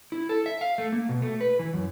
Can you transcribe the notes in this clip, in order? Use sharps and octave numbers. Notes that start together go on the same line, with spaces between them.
E4
A4
E5
F5
A3
A#3
B2
A3
B4
E3
F#2